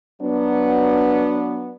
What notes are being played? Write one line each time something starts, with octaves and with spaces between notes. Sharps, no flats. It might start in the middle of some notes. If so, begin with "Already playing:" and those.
F#3 B3 D4